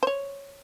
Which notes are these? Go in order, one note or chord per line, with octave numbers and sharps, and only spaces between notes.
C5
C#5